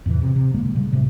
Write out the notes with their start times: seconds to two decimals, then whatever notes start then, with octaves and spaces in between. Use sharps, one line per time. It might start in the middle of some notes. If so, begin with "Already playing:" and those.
0.06 E2 A2 C3 E3
0.21 C3
0.36 C3
0.54 B2 D3 G#3 A#3
0.75 A#2 C#3 G3 A3
0.93 D2 A2 C3